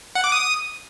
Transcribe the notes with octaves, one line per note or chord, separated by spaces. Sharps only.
F#5
D6
D#6